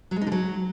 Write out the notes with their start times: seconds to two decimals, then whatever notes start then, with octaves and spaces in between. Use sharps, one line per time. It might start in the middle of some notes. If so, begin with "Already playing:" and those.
0.11 F#3
0.16 G#3
0.21 D#4
0.27 D3
0.32 F#3